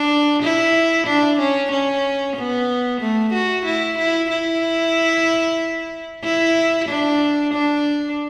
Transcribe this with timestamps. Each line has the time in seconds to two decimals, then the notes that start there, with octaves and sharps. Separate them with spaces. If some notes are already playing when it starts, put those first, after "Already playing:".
Already playing: D4
0.43 E4
1.07 D4
1.39 C#4
1.71 C#4
2.36 B3
3.01 A3
3.33 F#4
3.65 E4
3.98 E4
4.30 E4
6.24 E4
6.89 D4
7.54 D4